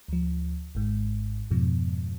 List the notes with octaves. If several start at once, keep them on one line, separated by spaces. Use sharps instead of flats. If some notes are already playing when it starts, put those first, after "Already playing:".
D2 F3
G#1 G#2
F2 G#2 B2 F3